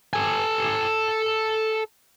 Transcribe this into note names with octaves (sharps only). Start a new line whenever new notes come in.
A4 G#5